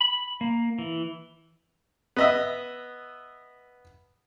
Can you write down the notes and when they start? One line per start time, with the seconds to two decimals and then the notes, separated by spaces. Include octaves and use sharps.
0.01 B5
0.41 A#3
0.79 E3
2.16 B3 D#5 E5